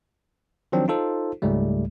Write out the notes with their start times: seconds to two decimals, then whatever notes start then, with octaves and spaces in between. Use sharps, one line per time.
0.72 D#3 F3 F#3 C4 D4
0.88 D#4 F4 A4 C5
1.42 C#2 G#2 G3 A3